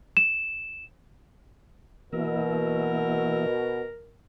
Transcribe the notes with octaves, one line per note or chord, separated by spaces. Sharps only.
E7
B2 E3 A#3 A#4 E5